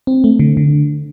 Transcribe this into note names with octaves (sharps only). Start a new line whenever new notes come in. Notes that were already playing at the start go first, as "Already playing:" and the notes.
C4
A3
D3
D3